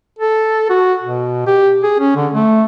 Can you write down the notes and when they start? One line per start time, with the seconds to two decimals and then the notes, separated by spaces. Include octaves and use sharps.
0.19 A4
0.70 F#4
1.02 B2
1.47 G4
1.83 G#4
1.99 C#4
2.16 D3
2.33 A3